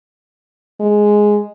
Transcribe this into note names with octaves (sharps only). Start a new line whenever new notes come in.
G#3